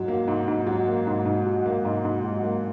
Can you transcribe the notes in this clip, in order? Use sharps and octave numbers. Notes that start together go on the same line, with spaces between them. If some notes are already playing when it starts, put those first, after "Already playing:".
Already playing: G#2 F#3
A#3
G#2
G#2
F#3
A#3
G#2
G#2
F#3
A#3
G#2
G#2
F#3
A#3